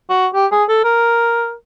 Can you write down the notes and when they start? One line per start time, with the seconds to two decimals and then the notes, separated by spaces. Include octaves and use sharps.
0.10 F#4
0.34 G4
0.52 G#4
0.69 A4
0.84 A#4